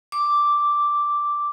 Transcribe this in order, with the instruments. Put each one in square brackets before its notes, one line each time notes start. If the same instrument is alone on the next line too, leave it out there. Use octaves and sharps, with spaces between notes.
[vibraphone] D6